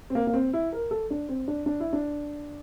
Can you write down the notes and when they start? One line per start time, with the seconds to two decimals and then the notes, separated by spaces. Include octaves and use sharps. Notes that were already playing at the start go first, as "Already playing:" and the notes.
0.10 C4
0.15 A#3
0.27 A#3
0.34 C4
0.53 E4
0.73 A#4
0.91 A4
1.10 D4
1.29 C4
1.48 D4
1.66 D4
1.80 E4
1.93 D4